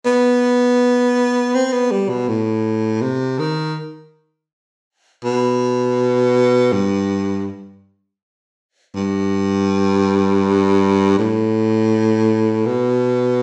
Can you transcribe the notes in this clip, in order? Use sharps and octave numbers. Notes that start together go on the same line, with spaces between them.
B3
C4
B3
G3
B2
A2
C3
D#3
B2
G2
G2
A2
B2